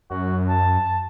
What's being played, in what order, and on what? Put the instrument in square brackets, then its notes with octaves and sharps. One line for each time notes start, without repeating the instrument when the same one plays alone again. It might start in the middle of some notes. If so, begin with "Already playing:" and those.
[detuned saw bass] F#2 [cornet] F#4
[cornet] A5